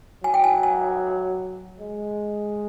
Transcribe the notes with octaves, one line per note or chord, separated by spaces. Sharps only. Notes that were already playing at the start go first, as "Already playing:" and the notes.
F#3 G#5
G5
G#5
G#5
G#3